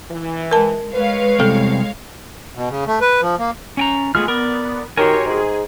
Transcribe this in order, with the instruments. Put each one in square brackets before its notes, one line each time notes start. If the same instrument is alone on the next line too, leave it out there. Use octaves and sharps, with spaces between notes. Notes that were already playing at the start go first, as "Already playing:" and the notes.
[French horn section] E3
[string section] G#3 [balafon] A#4 A5
[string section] G#3 C#5 F5 [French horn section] B4
[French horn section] E2 [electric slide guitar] C3 G3 C4 [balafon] A4
[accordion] B2
C#3
A3
B4
F3
A#3
[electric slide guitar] C#4 G5 A#5
[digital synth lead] G#3 [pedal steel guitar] A3 B3 F6 [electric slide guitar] F4 G#4
[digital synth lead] B3 [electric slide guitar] A#4 [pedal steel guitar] D5
[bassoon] D#3 [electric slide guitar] F#4 G4 A#4 [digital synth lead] C#5 [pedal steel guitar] G#5 C6
[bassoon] G#2 [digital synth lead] G#4